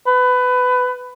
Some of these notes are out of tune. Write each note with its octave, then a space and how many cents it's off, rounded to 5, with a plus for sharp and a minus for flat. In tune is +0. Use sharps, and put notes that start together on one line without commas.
B4 +20